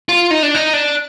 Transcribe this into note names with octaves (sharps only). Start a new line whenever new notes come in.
F4
D#4
D4
D#4
D4